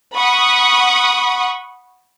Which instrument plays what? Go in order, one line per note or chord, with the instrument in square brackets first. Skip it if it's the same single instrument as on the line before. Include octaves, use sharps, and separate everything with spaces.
[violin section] F#5 B5 C#6 D#6